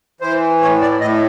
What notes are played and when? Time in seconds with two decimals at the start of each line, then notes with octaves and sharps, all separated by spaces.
0.21 E3 C5
0.60 A2 C#5
0.81 D5
1.00 A2 D#5